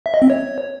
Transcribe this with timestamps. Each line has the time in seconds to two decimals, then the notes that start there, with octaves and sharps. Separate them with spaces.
0.06 E5
0.14 D#5
0.22 C4
0.30 C#5